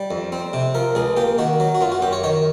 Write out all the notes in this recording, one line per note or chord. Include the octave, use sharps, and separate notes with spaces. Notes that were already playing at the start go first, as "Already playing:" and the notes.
Already playing: G3
F2
C4
C3
F3 A#4
C#2 G#4
A#3 G4
D#3 F#4
F#3
F#4
F#2 F4
F#4
F#2 G4
C#5
D#3 C#5